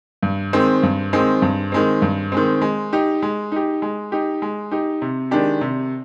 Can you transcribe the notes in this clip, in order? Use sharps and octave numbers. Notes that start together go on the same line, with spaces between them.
G2
D#3 G#3 C4
G2
D#3 G#3 C4
G2
D#3 G#3 C4
G2
D#3 G#3 C4
G#3
D#4 G4
G#3
D#4 G4
G#3
D#4 G4
G#3
D#4 G4
C3
D#3 G#3 D4 G4
C3